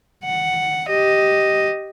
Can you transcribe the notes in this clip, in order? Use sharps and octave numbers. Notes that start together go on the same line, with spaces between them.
F#5
G4 D#5